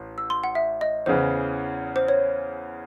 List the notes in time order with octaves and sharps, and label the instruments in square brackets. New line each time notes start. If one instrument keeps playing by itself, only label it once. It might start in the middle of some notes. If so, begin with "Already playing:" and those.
Already playing: [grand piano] A1
[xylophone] E6
C6
F#5
E5
D#5
[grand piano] E2 C#3 E3 [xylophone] C5
[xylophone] C5
C#5